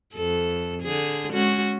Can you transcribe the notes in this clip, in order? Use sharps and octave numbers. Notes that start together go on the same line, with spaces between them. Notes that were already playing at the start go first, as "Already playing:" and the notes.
F2 A4
D3 G#4
G#3 C#4 F#4